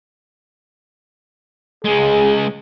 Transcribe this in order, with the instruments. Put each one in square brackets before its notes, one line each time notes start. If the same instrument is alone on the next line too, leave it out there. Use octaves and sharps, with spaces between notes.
[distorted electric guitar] C#2 G#3 [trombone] G#4